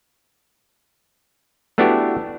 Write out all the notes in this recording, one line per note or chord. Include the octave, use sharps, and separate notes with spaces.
A3 B3 D4 E4 F#4 G4